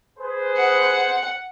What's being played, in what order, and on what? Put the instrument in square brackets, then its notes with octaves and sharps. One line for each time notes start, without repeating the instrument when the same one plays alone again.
[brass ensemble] G#4 B4 C5
[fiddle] F#5